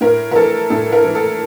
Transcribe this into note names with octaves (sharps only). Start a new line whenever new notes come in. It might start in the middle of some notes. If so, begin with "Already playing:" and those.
A2 A#4
A#4
E3 A4
A2 A4
A#4
E3
A4